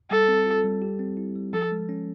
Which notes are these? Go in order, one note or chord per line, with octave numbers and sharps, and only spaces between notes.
G3 A4
C4
F4
G3
G4
C4
E4
G3
F3 A4
G#3
C#4